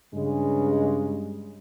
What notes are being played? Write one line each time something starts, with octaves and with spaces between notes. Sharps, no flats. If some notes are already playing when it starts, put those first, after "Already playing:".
G2 C#3 G#3